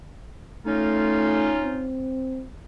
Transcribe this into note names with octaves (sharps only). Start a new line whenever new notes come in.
A3 C#4 D#4 F4
C4